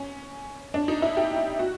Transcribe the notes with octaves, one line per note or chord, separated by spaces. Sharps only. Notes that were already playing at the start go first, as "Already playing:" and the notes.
Already playing: C#4
D4
D#4
E4
G4
F#4